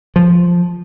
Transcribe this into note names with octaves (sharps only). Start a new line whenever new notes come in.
F3